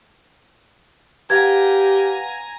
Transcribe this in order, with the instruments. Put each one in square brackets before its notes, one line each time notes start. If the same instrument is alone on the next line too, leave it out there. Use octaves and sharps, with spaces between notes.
[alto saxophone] G4 [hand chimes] B4 F5 F#5 [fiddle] G#5 A#5 [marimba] G#6